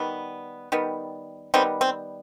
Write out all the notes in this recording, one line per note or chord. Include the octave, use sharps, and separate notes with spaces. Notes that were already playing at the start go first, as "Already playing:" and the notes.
Already playing: D#3 G3 B3
D#3 G3 B3
D#3 G3 B3 C4
C4